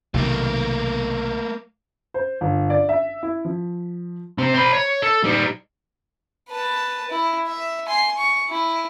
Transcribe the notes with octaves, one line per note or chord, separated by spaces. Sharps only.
B1 C3 D#3 A3 A#3
C5
G1
D5
E5
E4
F3
C3 C4
C5 B5
C#5
A4
G3 D#4
B4 A5
E4
E5
G#5 C6
C#6
E4